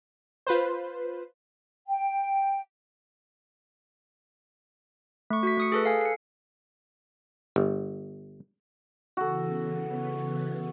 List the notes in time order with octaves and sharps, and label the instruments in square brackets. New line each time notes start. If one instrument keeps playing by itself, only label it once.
[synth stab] F4 B4 C5
[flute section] G5
[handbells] A3 C#6
F#4 C#6 B6
A3 D#6 C#7
G#4 A4 B4
A4 F5 G#5
C7 C#7
[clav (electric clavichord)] G1
[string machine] C#3 E3 B3 [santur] F#4 A4